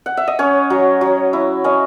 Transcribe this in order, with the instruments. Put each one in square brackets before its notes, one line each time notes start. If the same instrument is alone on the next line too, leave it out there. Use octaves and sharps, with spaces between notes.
[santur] F#5
E5
D#5
C#4 C#5
F#3
F#3
E4
C#4 D#5